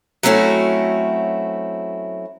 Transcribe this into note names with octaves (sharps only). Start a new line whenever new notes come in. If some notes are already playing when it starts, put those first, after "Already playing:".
F#3 A3 C4 C#4 E4 F#4